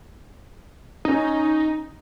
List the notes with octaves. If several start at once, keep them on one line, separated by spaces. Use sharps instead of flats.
C#4 D#4